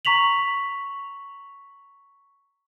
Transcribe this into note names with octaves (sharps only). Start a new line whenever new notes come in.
A#5 C#6 B6 F7 F#7